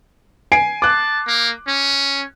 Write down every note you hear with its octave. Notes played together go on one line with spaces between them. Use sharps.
G#5 C7 D7
A5 D6 F#6
A#3
C#4